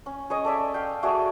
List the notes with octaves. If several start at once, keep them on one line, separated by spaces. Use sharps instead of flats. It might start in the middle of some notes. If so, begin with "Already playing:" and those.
C#4
G#4 C#5 D#5
A4 D5 E5
F5 G5
A3 F#4 G#4 D5